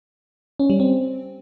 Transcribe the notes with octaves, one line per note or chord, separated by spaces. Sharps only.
C#4
G3
C4